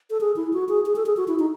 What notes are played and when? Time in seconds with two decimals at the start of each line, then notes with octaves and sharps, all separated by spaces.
0.10 A4
0.21 G#4
0.36 E4
0.53 F#4
0.69 G#4
0.86 G#4
0.96 A4
1.06 G#4
1.17 F#4
1.28 E4
1.39 D#4